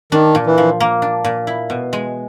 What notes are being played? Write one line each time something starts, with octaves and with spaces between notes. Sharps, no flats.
D#3 D4
A#2
E3
F3
A#3
D4
A#2
E4
B2
G#3